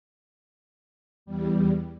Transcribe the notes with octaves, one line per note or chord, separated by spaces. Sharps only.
E2 G3